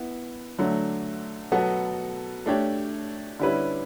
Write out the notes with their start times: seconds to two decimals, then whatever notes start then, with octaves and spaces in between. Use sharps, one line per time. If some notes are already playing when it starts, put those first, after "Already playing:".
Already playing: B3 E4
0.58 D3 F#3 A3
1.52 B2 F#3 B3 F#4 A4
2.46 A3 D4 G4 C#5
3.40 D3 G3 C#4 E4 B4